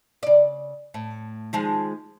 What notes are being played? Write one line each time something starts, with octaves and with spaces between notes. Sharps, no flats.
C#3 D5
A2
D#3 F3 G#3